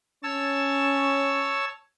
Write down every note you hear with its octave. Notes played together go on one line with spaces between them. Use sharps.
C#4 C#5 A5 E6